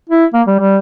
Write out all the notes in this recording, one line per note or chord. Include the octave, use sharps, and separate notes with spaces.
E4
A#3
G3
G3